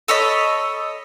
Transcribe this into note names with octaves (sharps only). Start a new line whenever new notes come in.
A4 C#5 D#5 B5